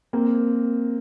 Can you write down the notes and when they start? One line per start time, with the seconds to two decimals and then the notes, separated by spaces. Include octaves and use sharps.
0.13 A#3 C4